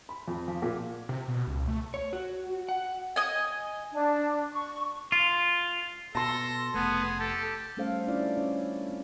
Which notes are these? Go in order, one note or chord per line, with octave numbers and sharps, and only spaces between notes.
B5
F2
F3
A#2
C3
B2
C#2
A3
C#5
F#4
F#5
D#5 G#5
D4
C#6
F4
B2 A4 A5 C6 A#6
F1 A3 B3 G#4
G4 A4
G3 A3 C#4 A4 C5 F5
C#4 D4 E4 F4 A4 D5
C#4 C#5
C4